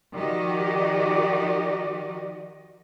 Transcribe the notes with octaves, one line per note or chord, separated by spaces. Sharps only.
D#3 F3 F#4 G4 D5 D#5